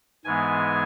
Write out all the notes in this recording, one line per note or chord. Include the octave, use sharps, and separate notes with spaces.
G#2 E3 G#3 B3 G#5